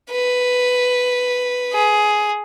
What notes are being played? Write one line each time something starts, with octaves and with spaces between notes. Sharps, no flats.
B4
G#4